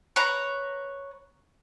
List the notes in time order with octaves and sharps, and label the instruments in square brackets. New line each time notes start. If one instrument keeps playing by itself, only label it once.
[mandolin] B4 C#5 A#5